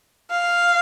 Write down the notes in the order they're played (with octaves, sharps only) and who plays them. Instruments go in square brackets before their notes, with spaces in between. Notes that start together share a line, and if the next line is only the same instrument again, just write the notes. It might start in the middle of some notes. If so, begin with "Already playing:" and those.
[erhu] F5